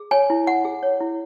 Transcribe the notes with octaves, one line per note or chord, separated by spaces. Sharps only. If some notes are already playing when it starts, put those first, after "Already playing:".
Already playing: G#4
C#5 G#5
E4
E4 F#5
G#4
C#5
E4